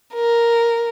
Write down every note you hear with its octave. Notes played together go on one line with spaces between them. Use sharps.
A#4